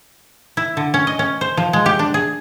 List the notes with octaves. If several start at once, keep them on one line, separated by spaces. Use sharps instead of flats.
E4
D3
C#4
D#5
C#4
C5
F3
G#3
G4
D4
G#4